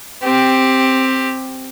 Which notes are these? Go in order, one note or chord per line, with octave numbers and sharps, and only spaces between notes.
C4 G4